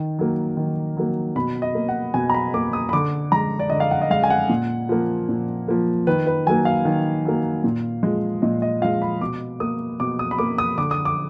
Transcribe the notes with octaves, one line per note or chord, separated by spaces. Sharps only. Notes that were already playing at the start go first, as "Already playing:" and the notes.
Already playing: D#3
F#3 A#3
D#3
F#3 A#3
B2 B5
D#5
A#3
F#5
B2 G#5
A#5
B5
A#3 D6
D#6
B5
D3 D6
G#3 A#5
D5
D3 D#5
F5
F#5
D#5
G#3 F5
G#5
F#5
A#2
F3 A#3
A#2
F3 A#3
D#3 B4
B4
F#3 A#3 G#5
F5
D#3
F#3 A#3
A#2
F3 G#3
A#2 D#5
D#5
F3 G#3 F5
B5
B2 D6
A#3 D#6
B2 D6
D#6
B5
A#3 D6
D#6
D3 D6
D#6
D6